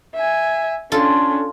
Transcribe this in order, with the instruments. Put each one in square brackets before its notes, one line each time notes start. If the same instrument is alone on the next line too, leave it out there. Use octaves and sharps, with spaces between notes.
[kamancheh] E5 G#5
[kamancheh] C#4 D4 [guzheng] F4 A4